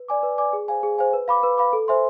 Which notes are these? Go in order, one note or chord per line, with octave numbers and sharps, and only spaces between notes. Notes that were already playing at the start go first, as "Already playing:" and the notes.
Already playing: B4
D5 G#5 D6
B4
D5 G#5 D6
G#4
C5 F5 G#5
G#4
C5 F5 G#5
B4
F5 B5 D6
B4
F5 B5 D6
A4
C5 E5 G#5 C6